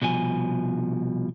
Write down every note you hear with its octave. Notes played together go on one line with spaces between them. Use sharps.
C2 B2 F3 G#5